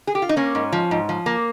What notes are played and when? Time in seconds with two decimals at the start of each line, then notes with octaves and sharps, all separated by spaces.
0.07 G#4
0.15 G4
0.22 F4
0.29 D#4
0.36 A#3 C#4
0.55 G#2
0.72 F3
0.91 G#2
1.09 F3
1.26 A#3